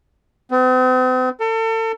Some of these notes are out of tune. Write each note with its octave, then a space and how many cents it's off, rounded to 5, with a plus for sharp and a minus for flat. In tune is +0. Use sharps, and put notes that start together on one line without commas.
C4 -45
A4 +35